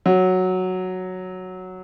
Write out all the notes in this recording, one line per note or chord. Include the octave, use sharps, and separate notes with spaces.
F#3